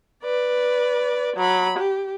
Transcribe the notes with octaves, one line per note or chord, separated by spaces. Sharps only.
B4 D5
F#3 B5
G4